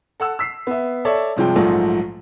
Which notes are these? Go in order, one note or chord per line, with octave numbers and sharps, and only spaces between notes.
A4 F#5 E6
E6 B6 C7
B3 E5
A4 C#5 D5 E5
G2 C3 F3 G#3 G5
A#1 G#2 F3 F#3 A3